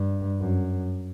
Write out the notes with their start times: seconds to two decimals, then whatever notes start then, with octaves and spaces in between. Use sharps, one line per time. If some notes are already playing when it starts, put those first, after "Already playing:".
Already playing: G2
0.41 F#2